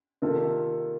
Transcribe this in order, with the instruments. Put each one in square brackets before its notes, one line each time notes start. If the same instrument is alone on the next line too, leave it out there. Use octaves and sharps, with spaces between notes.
[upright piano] C3 D#3 A#3 F4 A4